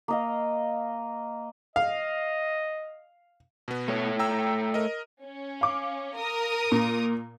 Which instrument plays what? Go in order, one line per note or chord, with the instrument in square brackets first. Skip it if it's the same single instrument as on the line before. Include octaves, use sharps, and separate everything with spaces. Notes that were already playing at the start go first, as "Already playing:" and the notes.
[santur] A#3 D#5 F5
[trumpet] D#5 [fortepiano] F5
[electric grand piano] B2 B3
[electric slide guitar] A3 C#5
[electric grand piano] G5 A#5 E6
A#4 D#5
[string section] C#4
[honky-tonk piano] F5 D6
[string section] A#4 D#6
[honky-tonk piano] A#2